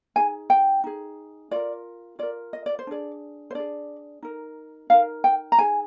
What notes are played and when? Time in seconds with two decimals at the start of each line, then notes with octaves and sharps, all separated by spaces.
0.16 D#4 G#4 G#5
0.50 G5
0.84 D#4 G#4
1.51 F4 A#4 D5
2.19 F4 A#4 D5
2.53 D#5
2.66 D5
2.79 C5
2.87 D4 G#4 D5
3.50 C5
3.55 D4 G#4 D5
4.23 D#4 A#4
4.90 D#4 A#4 F5
5.24 G5
5.52 A#5
5.58 D#4 G#4 G#5